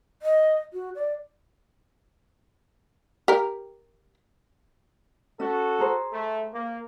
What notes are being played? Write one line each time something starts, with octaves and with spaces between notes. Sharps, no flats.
D#5
F#4
D5
G4 A#4
C#4 F#4 A4
G#4 A#4 C5
A3
A#3